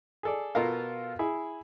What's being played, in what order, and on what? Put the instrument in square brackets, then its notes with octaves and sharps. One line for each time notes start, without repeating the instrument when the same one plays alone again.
[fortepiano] G#4 A4 D5
B2 F4 A4 A#4 F5
E4 G#4